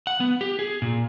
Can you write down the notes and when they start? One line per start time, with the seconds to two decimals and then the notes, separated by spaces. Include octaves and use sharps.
0.07 F#5
0.20 B3
0.41 G4
0.59 G#4
0.82 A#2